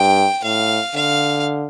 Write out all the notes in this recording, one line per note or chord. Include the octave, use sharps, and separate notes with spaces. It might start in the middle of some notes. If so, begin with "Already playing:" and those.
Already playing: G2 G5
A2 F5
D3 F5